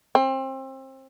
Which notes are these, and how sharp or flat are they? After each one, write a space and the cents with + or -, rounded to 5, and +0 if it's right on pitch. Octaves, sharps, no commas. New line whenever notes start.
C4 +30